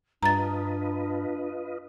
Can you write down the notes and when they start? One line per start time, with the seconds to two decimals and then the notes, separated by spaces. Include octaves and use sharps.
0.23 G2 D4 F4 B4 D#5 A#5 A6